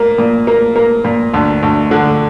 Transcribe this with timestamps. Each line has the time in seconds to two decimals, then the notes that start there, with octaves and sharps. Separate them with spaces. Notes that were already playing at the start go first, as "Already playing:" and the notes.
Already playing: A#2 A#3
0.18 A#2
0.47 A#3
0.76 A#3
1.05 A#2
1.34 D2
1.63 D2
1.91 D3